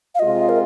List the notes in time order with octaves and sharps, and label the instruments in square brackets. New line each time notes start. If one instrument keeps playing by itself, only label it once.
[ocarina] F5
[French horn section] C3 G#3 F4 [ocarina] D#5
[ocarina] A#4